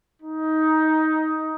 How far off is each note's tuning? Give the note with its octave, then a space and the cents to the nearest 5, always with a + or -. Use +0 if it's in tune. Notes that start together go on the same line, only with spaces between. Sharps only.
D#4 +15